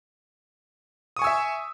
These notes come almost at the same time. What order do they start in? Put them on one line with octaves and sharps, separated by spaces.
D#6 C#6 G#5 E6 E5